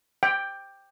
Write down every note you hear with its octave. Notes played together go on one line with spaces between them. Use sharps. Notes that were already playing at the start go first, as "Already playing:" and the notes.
G5